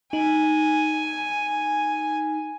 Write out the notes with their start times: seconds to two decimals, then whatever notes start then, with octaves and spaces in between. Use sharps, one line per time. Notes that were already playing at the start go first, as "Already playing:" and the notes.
0.13 D#4 G#5